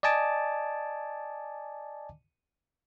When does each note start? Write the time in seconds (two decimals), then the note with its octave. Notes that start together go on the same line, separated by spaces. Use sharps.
0.03 D5 D#5 G#5 A5 D6